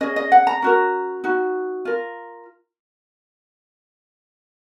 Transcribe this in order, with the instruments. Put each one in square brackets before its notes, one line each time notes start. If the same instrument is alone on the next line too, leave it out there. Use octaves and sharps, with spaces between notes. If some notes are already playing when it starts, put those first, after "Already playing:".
[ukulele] C#4 G#4 D#5
D#5
F#5
A#5
C#4 F#4 A#4
D#4 F#4
F4 A#4